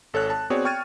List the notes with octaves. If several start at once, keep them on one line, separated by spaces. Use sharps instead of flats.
G#1 A4 C#5 F#6
A5
B3 C4 F#4 G#4 C#5 D5
G5 C#6 F6 G#6 A6 D#7